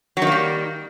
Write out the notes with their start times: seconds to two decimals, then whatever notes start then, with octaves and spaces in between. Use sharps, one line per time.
0.17 F#3
0.22 D#3
0.27 A#3
0.32 G3